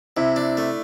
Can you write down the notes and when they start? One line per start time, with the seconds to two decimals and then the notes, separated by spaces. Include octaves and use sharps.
0.17 C3 E4
0.36 D4
0.57 A3